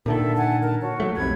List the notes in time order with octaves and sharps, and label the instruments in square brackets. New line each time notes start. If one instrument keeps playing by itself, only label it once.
[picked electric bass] A#2 D3 D#3 [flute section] A4 E5
[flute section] F#5 G#5 A5
A#4 A5
F#4 C#5
[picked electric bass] F#3 A3
[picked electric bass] B1 F2 C3 [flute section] B5 G#6